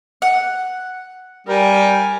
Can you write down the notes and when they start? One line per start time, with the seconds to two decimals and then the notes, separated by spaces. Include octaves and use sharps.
0.22 F#5
1.47 G3 A#4 G#5